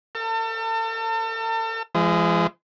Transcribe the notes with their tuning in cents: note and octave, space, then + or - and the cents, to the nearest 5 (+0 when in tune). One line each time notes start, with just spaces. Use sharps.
A4 +40 A5 +35
F3 -45 G#3 +0